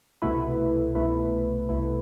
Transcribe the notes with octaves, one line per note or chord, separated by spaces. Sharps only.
C2 B2 A3 E4 B4
C2 B2 A3 E4 B4
C2 B2 A3 E4 B4